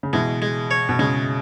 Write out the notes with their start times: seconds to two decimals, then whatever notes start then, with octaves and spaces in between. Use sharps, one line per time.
0.03 C#3
0.13 B2 E3 G#3
0.42 G#3
0.71 C#5
0.89 B2
0.99 C#3 G#3